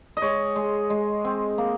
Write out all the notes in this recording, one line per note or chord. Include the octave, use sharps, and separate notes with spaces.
D#5
G#3 C#5
G#3
G#3
C4
A#3